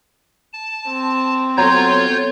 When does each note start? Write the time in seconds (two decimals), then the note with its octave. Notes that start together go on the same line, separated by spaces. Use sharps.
0.53 A5
0.89 C4
1.57 F#3 B3 F4 A4 C#5 A#5 G6